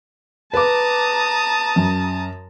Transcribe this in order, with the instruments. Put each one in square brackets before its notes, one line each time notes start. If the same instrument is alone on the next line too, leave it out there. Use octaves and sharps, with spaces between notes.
[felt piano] B4 D6 [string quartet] A5 A#5 D#6
[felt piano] F#2